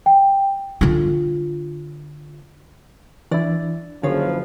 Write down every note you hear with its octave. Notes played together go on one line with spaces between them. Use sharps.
G5
D3 F4
E3 D4 E4 D5
F#1 D3 F3 G#4 B4 C#5